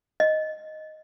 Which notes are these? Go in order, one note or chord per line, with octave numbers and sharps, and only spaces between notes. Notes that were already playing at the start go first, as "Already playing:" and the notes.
D#5